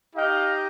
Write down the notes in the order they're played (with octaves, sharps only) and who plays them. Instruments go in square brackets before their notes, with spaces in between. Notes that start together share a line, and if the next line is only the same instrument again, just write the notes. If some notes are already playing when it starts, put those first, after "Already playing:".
[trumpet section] D#4 G4 D#5 G5 [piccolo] F5